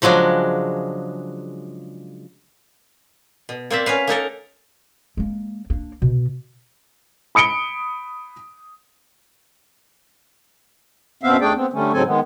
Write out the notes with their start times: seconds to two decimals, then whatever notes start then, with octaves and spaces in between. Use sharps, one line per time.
0.02 C#3 F3 F#3 G#3 D4
3.49 B2
3.70 A#3 C4 D5 E5
3.86 C#4 F#4 B4 F5
4.07 A#3 D#4 A4 A#4
5.17 G#3 A#3
5.70 A#3 D4
6.02 B2
7.35 B5 D#6 C#7 D7 G7
11.23 F#2 B2 B3 C4 E5 F5
11.41 D#2 A3 D4 G#4 D5 G5
11.55 B3 C4
11.73 D3 G3 A3 C#4
11.93 G#2 C#3 F#3 C4 A4 G#5
12.06 D#3 G#3 B3